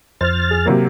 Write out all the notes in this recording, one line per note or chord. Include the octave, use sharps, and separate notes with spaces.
F2 C5 F6 A6
G#4
C3 F#3 A#3